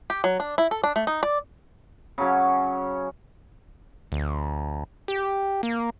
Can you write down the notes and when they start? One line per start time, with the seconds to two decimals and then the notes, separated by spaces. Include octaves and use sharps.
0.10 G4
0.24 F#3
0.40 D4
0.58 E4
0.71 A4
0.84 D4
0.96 A3
1.07 D#4
1.23 D5
2.18 C#3 F#3 C#4
4.12 D2
5.08 G4
5.63 A#3